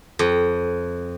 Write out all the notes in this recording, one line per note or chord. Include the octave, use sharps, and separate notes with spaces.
F2